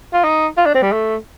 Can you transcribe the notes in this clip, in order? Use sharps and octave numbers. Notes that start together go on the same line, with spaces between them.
F4
D#4
F4
D4
C4
G3
A3